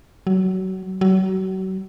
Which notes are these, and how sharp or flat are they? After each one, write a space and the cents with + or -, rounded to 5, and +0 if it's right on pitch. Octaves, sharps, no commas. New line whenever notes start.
F#3 +25
F#3 +35